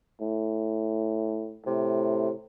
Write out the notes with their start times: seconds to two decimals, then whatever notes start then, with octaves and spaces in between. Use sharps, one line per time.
0.21 A2
1.66 A2 C3